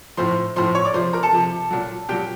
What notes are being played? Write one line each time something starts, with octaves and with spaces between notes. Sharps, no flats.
A2 F3 C5 C6
A2 F3 C5 C6
C#5 C#6
D5 D6
C3 F3 C5 C6
A#4 A#5
A4 A5
C3 F3
A#2 F#3
A#2 F#3 G4 G5